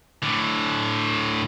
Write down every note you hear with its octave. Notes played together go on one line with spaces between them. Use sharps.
A2 D3